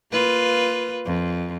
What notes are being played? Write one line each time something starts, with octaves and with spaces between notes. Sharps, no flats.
A#3 F4 B4
F2